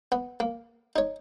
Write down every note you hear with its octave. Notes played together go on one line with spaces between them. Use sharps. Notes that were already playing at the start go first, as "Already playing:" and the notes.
B3
A#3
D#4 C#5